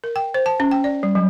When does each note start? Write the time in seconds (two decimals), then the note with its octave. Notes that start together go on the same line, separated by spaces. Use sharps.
0.04 A#4
0.16 G5
0.34 C5
0.46 A5
0.60 C#4
0.71 G5
0.84 D5
1.03 G3
1.15 F#3